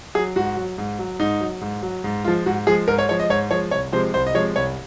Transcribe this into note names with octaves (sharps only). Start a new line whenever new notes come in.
F#3 G#4
G#2 F#4
F#3
G#2
F#3
G#2 D#4
F#3
G#2
F#3
G#2
F3 G#3 F4
G#2 F#4
F3 G#3 G#4
G#2 A#4
C#5
F3 G#3 C#5
D#5
G#2 C#5
F3 G#3 C#5
C2 C#5
C3 F3 G#3 C5
C2 C5
D#5
C3 F3 G#3 C#5
C2 C#5